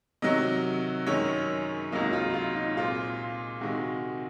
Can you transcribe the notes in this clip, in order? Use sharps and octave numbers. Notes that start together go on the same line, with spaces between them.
C3 D#3 F#3 D#5
F#2 D#3 G#3 C#4 C#5
C#2 C3 F#3 A#3 D#4
F4
F4
D#4
A#2 G#3 C4 F4
C3 D#3 G#3 F#4